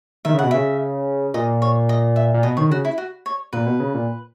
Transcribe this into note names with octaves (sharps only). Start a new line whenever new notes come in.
D#3 E5
C#3
F#5
B2
C#3 E5
A#2 D#5
C#5
D#5
E5
A#2
B2 D#5
D#3 C#5
C#3 F#4
E4
F#4
C#5
A#2 B4
B2
C#3
A#2